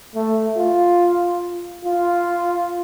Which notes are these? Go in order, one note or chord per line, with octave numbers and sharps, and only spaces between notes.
A3
F4
F4